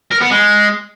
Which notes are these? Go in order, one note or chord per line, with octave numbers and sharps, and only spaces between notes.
A#4
B3
G#3